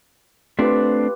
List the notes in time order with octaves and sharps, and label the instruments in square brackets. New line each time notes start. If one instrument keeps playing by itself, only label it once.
[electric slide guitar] A3 C4 D4 [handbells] F4 G4 B4